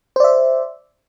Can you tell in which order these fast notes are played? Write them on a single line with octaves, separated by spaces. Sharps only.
C5 D5 E5